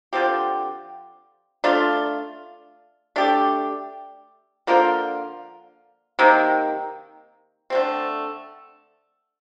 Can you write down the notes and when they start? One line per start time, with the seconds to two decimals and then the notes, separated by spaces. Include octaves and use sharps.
0.13 D3 F3 C4 G4
1.64 A3 D4 F4
3.16 A3 D4 G4
4.67 D3 F3 A#3 F4
6.19 C3 D#3 A#3
7.70 D3 A3 C4